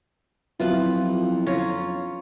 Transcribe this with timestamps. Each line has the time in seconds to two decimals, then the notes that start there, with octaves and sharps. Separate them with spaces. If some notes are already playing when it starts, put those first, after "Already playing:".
0.60 F2 F#3 B3 E4 F4 B4
1.47 C#4 F4 A#5